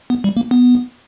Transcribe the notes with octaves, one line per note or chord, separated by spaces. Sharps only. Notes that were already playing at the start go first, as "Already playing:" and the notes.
B3
G3
A#3
B3